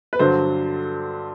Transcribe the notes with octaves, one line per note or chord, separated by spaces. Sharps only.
B4
G2 D3 F#3 C5